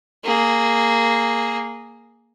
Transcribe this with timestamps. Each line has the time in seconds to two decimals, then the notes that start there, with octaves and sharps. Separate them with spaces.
0.24 A#3 G#4